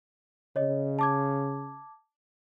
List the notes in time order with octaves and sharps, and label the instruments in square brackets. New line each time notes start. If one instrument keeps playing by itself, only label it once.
[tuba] C#3 [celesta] C#5 D#5
[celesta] A5 D6 G#6